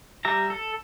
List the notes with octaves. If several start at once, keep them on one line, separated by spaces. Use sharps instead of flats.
G3 G4 E5 A#5
A4